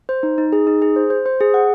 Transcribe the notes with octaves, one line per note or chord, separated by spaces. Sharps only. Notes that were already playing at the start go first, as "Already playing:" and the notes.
C5
D#4
D#4
G#4
D#4
G#4
C5
C5
C5
G#4
F#5